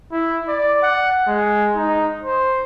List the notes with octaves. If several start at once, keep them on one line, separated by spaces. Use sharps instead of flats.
E4
D5
F#5
G#3
D#4
C5